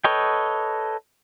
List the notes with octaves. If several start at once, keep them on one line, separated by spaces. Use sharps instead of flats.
A4 B4 C#5 D#5 G5